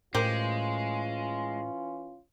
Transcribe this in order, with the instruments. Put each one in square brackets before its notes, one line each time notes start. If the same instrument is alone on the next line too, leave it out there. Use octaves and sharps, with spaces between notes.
[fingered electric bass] A2 [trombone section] E3 C#4 F4 [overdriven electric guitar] G#3 [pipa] G4 A#4 C5